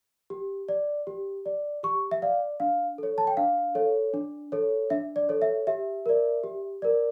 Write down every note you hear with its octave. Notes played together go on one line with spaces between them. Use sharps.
G4
D5
G4
D5
G4 C#6
E5
D5 F5
D4 F5
A4 C#5
A5
G5
D4 F5
A4 C#5
D4
A4 C#5
D4 E5
D5
A4 C#5
E5
G4 E5
A#4 D5
G4
A#4 D5